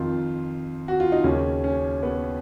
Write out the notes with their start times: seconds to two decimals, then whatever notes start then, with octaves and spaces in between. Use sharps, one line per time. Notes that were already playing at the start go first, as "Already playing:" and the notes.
Already playing: F2 D#3 F4
0.88 F#4
1.00 F4
1.12 D#4
1.24 D#2 C#3 C#4
1.64 C#4
2.03 B3